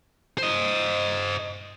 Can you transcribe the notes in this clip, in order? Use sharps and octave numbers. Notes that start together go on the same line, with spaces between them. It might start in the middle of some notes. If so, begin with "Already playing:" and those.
C5 D#5